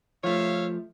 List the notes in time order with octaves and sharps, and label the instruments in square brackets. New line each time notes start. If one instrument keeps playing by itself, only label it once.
[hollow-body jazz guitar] F3 A3 [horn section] C#5 E5 F5